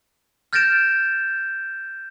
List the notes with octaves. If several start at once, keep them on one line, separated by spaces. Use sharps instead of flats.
F6 G6 A6 A#6 D7 E7